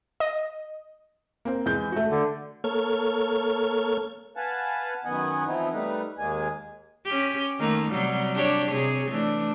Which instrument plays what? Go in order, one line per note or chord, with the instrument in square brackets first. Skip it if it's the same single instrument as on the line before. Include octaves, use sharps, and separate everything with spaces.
[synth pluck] D#5
[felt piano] A#3 C4
E2 G#3 G6
A3 F#4
[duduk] D3
[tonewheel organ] A#3 A4 C#5 F6 G#6
[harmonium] B4 F5 F#5 G#5 A5
F#2 D#3 B3 D#5 F#5 G#5
E3 F3 B3 C4 D#4 E4
G3 A3 D#4 A#4 B4
D#2 G#3 A#3 G#4 G#5
[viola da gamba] C#4 G4
D#3 A3 A#3
C3 F#3 G3
D4 G4 C#5
C3 G#4 C#5
E3 A3 D4